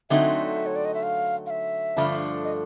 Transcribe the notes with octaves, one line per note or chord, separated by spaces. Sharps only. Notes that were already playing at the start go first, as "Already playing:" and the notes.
D3 F#3 A3 C4 D#4 E5
C#5
D5
D#5
E5
F5
F5
E5
G2 D3 F3 A3 D4
D#5